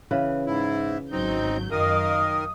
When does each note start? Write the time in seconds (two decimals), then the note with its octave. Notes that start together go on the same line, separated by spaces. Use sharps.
0.11 C#3 E3 B4
0.47 G#2 E4
1.12 G#1 F#3 C4 D#4 G6
1.71 F#2 D#3 A#4 D#5 F5 D#6